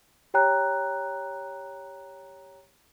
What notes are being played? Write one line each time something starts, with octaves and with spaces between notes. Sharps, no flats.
G4 C#5 G5 A#5 F#6